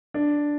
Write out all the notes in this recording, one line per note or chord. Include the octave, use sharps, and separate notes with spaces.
D4